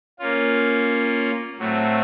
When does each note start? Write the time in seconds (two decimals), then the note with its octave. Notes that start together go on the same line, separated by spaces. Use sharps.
0.19 A#3 C#4 F4
1.59 A2 F#3 A3 C4